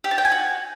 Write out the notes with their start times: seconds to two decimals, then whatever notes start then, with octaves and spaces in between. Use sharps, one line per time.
0.04 G4
0.11 A5
0.18 G5
0.25 G#5
0.32 F#4